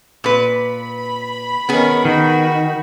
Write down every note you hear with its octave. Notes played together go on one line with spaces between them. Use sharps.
A#2 B4
B5
D#3 B3 C#4 G#4
D#3 F#4